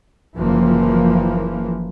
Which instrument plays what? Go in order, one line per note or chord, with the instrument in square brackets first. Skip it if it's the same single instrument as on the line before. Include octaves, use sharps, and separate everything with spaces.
[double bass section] F#1 E3 F3 A#3